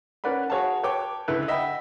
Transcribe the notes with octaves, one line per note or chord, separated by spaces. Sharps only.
C#4 A#4 B4 D5 F#5 B5
F#4 G#4 C#5 F5 F#5 A5
B4 C#5 G5 A5 D6
C#2 D3 E4 B4
D#5 E5 F#5 G5 B5